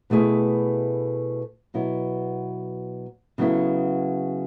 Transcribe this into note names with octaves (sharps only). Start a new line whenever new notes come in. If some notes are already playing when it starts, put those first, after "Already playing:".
B2 A3 E4 G#4 B4
B2 F#3 B3 E4
C#3 F#3 B3 E4 A4